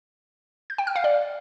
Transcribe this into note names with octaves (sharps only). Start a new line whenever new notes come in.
G6
G5
F6
F5
D5